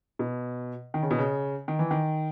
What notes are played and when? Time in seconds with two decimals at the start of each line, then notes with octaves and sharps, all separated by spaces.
0.19 B2
0.94 D#3
1.03 C#3
1.11 B2
1.19 C#3
1.68 D#3
1.79 E3
1.91 D#3